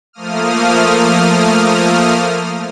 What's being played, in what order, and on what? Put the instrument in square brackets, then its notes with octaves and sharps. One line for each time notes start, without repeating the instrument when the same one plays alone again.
[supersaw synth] F3 A3 A#3 D#6 F6